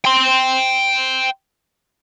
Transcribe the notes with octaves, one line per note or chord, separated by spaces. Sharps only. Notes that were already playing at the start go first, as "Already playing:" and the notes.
G5 C6